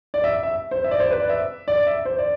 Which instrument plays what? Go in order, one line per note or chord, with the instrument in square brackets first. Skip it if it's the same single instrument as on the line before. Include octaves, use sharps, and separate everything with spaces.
[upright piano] D5
E5
E5
C5
E5
D5
C5
B4
D5
E5
D5
E5
C5
D5